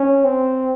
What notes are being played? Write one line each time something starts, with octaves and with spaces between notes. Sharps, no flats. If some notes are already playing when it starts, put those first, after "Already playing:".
Already playing: C#4
C4